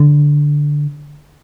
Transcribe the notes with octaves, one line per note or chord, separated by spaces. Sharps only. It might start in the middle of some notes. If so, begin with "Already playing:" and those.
Already playing: D3